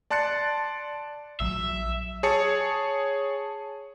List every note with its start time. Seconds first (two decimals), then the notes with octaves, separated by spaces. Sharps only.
0.10 D5 A5 C6 F#6 A6 C#7
1.40 A#1 F3 F#3 E5
2.23 G#4 C#5 A5 C#7